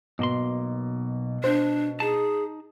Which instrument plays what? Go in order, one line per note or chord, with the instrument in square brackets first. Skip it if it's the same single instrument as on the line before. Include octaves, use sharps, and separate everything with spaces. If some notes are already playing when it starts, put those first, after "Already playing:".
[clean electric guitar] B1 A#3 C6 [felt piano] B2
[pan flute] D4 [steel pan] C5
[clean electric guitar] D#4 A5 [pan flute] G#4